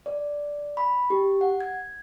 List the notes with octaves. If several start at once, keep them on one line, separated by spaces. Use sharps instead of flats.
D5
B5
G4
F#5
G#6